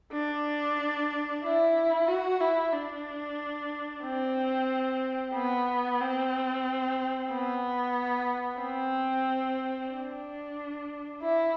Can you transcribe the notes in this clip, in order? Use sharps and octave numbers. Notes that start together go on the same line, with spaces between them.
D4
E4
F#4
E4
D4
C4
B3
C4
B3
C4
D4
E4